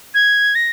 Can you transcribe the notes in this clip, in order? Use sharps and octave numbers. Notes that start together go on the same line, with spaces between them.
G#6
A#6